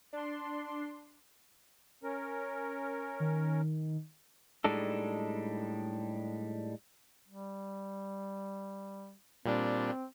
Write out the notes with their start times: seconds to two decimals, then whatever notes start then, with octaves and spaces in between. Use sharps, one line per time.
0.13 D4 C6
2.03 C#4 A#4
3.20 D#3
4.64 A2 G3 G#3 D4 D#4 A4
7.28 G3
9.46 A#2 G3 C4 D4